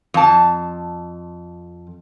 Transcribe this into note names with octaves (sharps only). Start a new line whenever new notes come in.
F2 A5